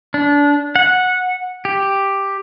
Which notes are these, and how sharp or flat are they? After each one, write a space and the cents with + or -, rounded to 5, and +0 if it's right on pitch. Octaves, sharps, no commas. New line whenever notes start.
D4 -25
F#5 -10
G4 +5